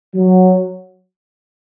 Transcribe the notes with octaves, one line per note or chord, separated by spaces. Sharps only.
F#3